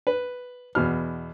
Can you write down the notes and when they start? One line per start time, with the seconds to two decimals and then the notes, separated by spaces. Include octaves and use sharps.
0.07 B4
0.75 E2 B2 F6